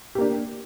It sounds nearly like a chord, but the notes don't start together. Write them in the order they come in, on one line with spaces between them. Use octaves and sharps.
G4 A#3 D4